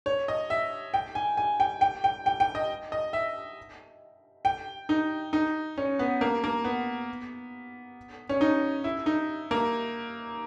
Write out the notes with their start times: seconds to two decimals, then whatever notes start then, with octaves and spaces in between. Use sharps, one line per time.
0.06 C#5
0.28 D#5
0.50 E5
0.94 G5
1.15 G#5
1.37 G#5
1.60 G5
1.81 G5
2.04 G5
2.26 G5
2.40 G5
2.55 D#5
2.92 D#5
3.13 E5
4.45 G5
4.89 D#4
5.33 D#4
5.78 C#4
5.99 B3
6.21 A#3
6.44 A#3
6.64 B3
8.29 C#4
8.41 D#4
8.84 E4
9.06 D#4
9.51 A#3